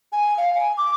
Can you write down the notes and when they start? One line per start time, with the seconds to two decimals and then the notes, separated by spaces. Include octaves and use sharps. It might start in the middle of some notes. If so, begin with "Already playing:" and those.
0.12 G#5
0.37 F5
0.55 G#5
0.78 D6